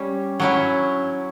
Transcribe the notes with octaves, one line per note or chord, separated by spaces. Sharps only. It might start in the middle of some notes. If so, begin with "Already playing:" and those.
Already playing: G3 C#4 G4
F#3 C#4 E4